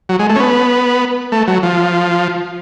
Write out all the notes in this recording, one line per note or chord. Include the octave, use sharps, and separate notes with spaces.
F#3
G#3
A3
C#4
B3
A3
F#3
F3